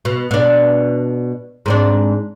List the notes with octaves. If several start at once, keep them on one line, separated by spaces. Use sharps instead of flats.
B2
B2 D4
G#2 C4 D4